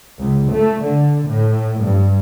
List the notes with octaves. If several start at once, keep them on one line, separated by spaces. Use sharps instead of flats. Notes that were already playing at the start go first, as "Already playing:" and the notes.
C#2
A3
D3
A2
G2